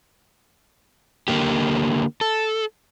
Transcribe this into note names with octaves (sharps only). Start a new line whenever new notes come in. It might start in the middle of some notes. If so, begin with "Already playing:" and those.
D3 A#3 G4
A4